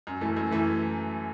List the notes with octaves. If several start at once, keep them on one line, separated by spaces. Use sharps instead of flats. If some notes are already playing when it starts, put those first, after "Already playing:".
F#2
E3 A3
F#2
E3 A3